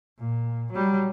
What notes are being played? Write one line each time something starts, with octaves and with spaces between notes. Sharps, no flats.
A#2
F#3 G3